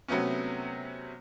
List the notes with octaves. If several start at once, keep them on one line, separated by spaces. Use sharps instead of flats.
C3 F#3 A3 B3 C#4